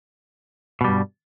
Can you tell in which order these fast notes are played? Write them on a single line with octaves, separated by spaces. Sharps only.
B2 G3 G2